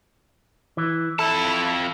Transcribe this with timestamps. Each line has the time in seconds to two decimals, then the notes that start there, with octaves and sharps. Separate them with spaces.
0.77 E3
1.19 F2 E4 A4 A5